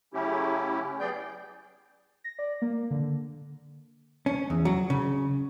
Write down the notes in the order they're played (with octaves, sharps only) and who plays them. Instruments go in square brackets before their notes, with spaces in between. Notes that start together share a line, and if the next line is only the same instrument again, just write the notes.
[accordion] C#3 F#3 A3 C#4 E4 G4
F#3 B3 G#4 D5 G5 G6
[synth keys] A#6
D5
A#3
D3
D3
[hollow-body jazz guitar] C#4
E2
F#3
C#3